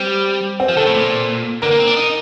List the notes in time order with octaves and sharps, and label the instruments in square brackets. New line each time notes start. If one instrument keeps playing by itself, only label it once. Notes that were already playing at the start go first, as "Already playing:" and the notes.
Already playing: [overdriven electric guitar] G3 [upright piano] C4
[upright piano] C4
[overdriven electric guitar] F3
[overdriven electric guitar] D#3 [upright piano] A4
[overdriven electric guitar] A2
A#2
[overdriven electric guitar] D3 [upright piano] A#4
[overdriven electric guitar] A#3
C4
D4
D#4